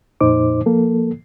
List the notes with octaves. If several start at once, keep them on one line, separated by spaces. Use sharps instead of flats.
F2 A#2 D#4 C5 D6
F3 A#3 A4